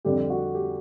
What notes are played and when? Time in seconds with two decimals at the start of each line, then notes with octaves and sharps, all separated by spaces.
0.05 F2 D3 G3 G4
0.30 F#4
0.55 G4